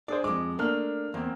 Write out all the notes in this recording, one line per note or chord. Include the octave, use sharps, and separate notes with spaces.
D4 G#4 C5 D5
F2 G#3 D6
A3 A#3 D4 F6
E2 A#3 C4